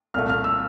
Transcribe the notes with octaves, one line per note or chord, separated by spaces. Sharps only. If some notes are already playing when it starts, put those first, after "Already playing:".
C2 A#2 A3 F6
F6
E6